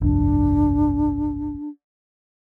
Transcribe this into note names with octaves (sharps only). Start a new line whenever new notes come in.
G1 C2 F2 D4